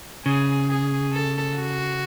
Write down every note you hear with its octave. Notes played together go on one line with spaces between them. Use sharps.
C#3 G#4
G#4
A4
F#4